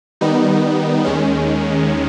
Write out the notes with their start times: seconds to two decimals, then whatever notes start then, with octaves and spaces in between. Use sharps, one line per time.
0.21 D#3 G3 B3 D#4
1.05 D#2 D#3 G#3 C#4